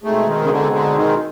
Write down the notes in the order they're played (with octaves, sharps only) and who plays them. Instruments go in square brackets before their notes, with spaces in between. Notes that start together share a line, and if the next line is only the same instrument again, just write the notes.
[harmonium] B2 G#3 C4 D#4 G#4 [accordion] A3
[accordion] D#3
C#3
D3
D3
D#3